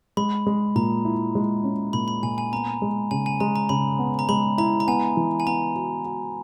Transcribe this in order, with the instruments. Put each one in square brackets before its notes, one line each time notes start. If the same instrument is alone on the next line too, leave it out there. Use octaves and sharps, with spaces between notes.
[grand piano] G#3 [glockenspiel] B5
[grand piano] G#3
[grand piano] A#2 [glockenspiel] A#5
[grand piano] E4
G#3
C#4
[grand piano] A#2 [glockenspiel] B5
[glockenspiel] B5
[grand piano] A#2 [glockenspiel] G#5
[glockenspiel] G#5
[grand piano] B3 [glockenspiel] A#5
[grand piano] G#3
[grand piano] C#3 [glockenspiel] G#5
[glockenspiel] G#5
[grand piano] G#3 [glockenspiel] A#5
[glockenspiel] A#5
[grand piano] C#3 [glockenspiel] B5
[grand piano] B3
[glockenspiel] A#5
[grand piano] G#3 [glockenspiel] B5
[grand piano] E4 [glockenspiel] A#5
[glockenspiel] A#5
[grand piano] B3 [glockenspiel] G#5
[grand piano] E3
[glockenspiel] G#5
[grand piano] B3 [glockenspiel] A#5
[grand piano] F#4
F#4